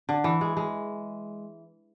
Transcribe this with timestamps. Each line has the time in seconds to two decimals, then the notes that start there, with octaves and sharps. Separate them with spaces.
0.09 D3
0.24 E3
0.41 G#3
0.57 G#3